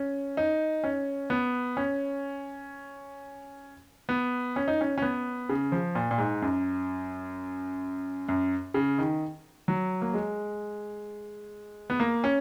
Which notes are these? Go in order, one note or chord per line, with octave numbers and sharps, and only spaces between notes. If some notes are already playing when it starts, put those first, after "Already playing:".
Already playing: C#4
D#4
C#4
B3
C#4
B3
C#4
D#4
C#4
C#4
B3
C#3
F3
A#2
A#2
G#2
F#2
F#2
C#3
D#3
F#3
A#3
G#3
B3
A#3
C#4